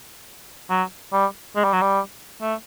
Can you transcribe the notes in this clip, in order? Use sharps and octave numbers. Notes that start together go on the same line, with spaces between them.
F#3
G3
G#3
G3
F#3
G3
A3